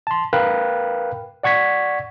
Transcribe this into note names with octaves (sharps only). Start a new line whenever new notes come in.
A5 C6
A#4 B4 F5 G5 B5 F#6
D5 F#5 C#6 G#6 B6